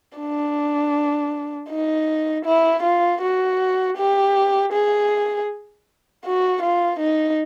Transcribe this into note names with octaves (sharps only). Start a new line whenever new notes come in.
D4
D#4
E4
F4
F#4
G4
G#4
F#4
F4
D#4